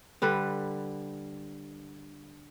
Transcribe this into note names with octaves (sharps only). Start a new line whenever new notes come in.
D3 G3 B4